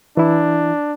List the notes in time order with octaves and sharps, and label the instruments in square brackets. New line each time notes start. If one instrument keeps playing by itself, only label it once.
[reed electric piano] E3 E4 [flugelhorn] D4